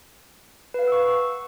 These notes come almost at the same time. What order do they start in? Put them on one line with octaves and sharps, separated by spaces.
B4 F5 F#5 E6 C#6